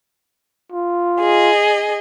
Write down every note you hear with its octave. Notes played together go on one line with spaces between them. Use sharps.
F4
G#4 D#5